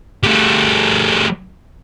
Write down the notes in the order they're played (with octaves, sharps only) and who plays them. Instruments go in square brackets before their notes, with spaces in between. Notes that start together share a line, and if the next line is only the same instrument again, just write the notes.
[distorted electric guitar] G3 A3